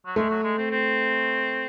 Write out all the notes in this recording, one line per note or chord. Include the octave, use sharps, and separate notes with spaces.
F#3
G#3 A3
F#3
G#3
C4
C4